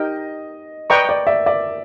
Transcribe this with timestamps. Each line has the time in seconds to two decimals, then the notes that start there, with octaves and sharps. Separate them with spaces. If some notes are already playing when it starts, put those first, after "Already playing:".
Already playing: D#4 G4 A#4 D#5 G5
0.90 B4 D5 D#5 G5 A#5 C#6
1.09 D5
1.27 D5 E5
1.46 D5 E5